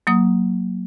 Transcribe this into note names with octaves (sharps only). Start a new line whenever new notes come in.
F#3 A#3 D#6